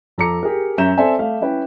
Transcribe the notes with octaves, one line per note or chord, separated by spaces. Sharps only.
F2 A4 A#5 D6 C#7
G4 G#4 A#4
F#2 C#4 E5 A#5 G6 E7
C4 A4 C5 D5 E5 G#5
A3 F5
C#4 E4 B4 G5